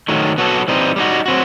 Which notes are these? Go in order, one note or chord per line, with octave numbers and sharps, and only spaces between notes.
D#3 F#3 A3
F#3 B3 F#4 A4
E3 G3 C4 D#4
G3 B3 D#4 F#4
F#3 C4 F#4